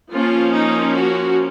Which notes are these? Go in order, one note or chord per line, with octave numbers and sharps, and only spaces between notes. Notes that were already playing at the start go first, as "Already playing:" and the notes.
F3 A#3 C#4 F4
D#4
F#4